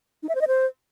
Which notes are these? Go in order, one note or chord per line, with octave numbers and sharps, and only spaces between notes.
D#4
E5
C5
D#5
C5